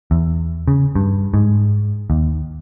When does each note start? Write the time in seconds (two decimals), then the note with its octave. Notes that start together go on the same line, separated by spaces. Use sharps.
0.11 E2
0.68 C#3
0.95 G2
1.34 G#2
2.10 D#2